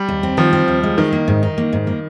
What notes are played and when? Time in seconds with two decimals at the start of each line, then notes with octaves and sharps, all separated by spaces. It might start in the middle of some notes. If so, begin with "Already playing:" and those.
Already playing: G3
0.08 D#2
0.23 C4
0.37 D#3 F3
0.53 C4
0.68 D#2
0.83 G#3
0.98 D#3 D#4
1.13 A#3
1.28 G#2
1.43 D#4
1.58 A#3
1.73 G#2
1.87 A#3